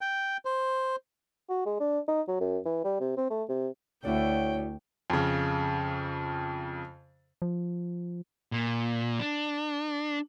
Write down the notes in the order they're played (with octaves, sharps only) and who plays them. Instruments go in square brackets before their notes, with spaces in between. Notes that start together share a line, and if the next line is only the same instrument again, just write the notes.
[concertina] G5
C5
[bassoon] F#4
G#3
D4
D#4
F#3
F#2
E3
G3
C3
C4
A3
C3
[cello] D2 [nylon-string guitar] E4 F#4 D5 [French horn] C#5 [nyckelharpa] G5
[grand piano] F2 C#3
[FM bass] F3
[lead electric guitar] A#2
D4